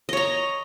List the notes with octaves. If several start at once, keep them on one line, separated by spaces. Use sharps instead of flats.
C#5 D#5 A#5